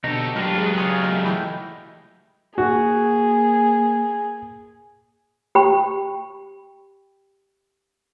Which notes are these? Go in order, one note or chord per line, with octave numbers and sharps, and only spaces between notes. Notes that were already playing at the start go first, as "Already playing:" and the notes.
B2 D3 D#4 G4 A4 C#5
A2 F#3 D4 F4 G4 A#4 F5
C#3 G#3 B3
F4 G#4 C#5 F5 G#5
G#3 A3 D#4 F5
E3 E4 G5
A#3 F#4 G#4
G4 G5 B5